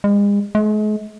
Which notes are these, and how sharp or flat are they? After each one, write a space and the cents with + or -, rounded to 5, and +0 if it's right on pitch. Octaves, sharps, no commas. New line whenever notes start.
G#3 -40
G#3 +40